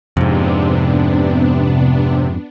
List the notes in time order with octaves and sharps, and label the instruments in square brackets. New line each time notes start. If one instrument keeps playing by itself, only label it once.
[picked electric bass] F2 G#2 [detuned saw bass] C3 [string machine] B3 D4